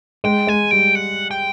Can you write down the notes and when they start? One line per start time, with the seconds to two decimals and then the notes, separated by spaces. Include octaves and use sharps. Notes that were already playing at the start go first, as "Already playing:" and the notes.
0.24 G#3 G5
0.47 G#3 G#5
0.71 G3 G5
0.95 F#5
1.31 G5